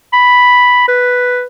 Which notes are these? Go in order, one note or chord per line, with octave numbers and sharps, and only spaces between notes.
B5
B4